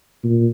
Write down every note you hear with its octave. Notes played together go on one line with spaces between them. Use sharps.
A#2